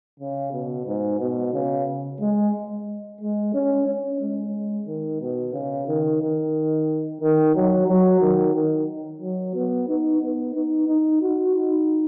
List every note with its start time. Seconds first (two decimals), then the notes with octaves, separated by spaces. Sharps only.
0.20 C#3
0.53 B2
0.87 G#2
1.20 B2
1.54 C#3
2.20 G#3
3.21 G#3
3.54 C#4
3.87 C#4
4.21 G#3
4.87 D#3
5.21 B2
5.54 C#3
5.87 D#3
6.21 D#3
7.21 D#3
7.55 F#3
7.88 F#3
8.21 D#3
8.54 D#3
9.21 F#3
9.55 B3
9.88 D#4
10.21 B3
10.55 D#4
10.88 D#4
11.21 F#4
11.55 D#4